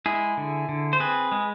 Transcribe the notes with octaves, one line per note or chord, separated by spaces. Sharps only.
G#3 E4 G#4
D3
D3
C5
C4 G#4 B4
G#3